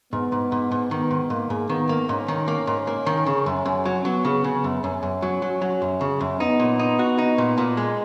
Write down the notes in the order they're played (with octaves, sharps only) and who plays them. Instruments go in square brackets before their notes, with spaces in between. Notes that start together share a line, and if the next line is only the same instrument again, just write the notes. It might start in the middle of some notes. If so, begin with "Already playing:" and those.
[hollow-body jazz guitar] G#2 [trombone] B3
[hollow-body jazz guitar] G#2
G#2
G#2
[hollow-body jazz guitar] D#3 [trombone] B3
[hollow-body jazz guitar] G#2
[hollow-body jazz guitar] G#2 [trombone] A#3
[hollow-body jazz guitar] G#2
[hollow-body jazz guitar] D#3 [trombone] B3
[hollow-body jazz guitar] A#3
[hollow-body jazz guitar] G#2 [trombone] C#4
[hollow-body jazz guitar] D#3
A#3
G#2
A#3
D#3
C#3
F#2
F#2
F#3
[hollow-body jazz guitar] F#3 [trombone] B3
[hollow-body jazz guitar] C#3
C#3
F#2
[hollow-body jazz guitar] F#2 [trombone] C#4
[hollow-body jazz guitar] F#2
F#3
F#3
F#3
F#2
C#3
F#2
[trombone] B3 [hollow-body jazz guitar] D#4
[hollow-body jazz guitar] A#2
D#4
F#4
D#4
A#2
A#2
G#3